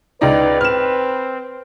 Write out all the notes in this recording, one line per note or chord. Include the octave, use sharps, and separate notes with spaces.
C#2 D#4 B4 D5
C4 F6 E7